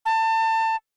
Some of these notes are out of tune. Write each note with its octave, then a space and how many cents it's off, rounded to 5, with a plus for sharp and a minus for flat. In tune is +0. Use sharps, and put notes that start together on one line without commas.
A5 +30